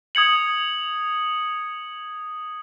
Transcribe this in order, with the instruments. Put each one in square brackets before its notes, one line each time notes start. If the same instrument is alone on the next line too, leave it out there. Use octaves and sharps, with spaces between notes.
[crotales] D#6 G#6 C#7 F#7